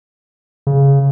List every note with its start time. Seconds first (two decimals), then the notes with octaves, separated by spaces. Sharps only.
0.67 C#3